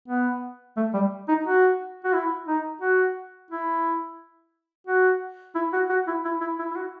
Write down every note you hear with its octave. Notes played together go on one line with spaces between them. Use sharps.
B3
A3
G3
D#4
F#4
F#4
E4
D#4
F#4
E4
F#4
E4
F#4
F#4
E4
E4
E4
E4
E4
F#4